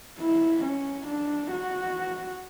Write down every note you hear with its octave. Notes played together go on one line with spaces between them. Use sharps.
E4
C#4
D4
F#4